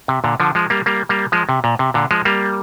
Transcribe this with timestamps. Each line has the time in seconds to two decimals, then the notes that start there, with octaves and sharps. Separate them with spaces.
0.08 C3
0.24 A#2 D3
0.40 D3 F3
0.55 F3 G#3
0.70 G3 A#3
0.86 G3 A#3
1.09 G3 A#3
1.32 F3 G#3
1.49 C3
1.64 A#2
1.79 C3
1.94 A#2 D3
2.11 F3 G#3
2.25 G3 A#3